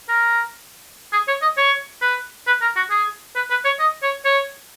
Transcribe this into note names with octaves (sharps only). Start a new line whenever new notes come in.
A#4
G#4
C#5
D#5
C#5
B4
B4
A#4
F#4
G#4
B4
B4
C#5
D#5
C#5
C#5